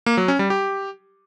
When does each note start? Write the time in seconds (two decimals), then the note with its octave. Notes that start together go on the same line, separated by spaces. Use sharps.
0.06 A#3
0.17 F#3
0.28 C#4
0.39 G3
0.50 G4